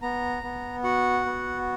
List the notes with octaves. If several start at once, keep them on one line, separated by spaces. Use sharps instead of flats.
B3 A#5
B3
F#4 F#5
B3